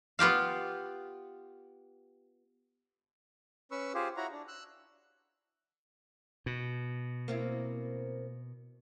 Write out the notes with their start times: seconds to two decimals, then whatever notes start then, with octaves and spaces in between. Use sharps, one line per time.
0.19 B3 F4 G4 F5
3.71 C#4 B4 C#6 E6
3.94 F4 G4 G#4 C5
4.17 E4 F#4 C#5 F#5 A#5
4.32 D4
4.48 E6 F#6
6.46 B2
7.28 A#3 C4 E4